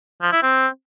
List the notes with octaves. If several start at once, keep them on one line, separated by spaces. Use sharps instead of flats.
F3
E4
C4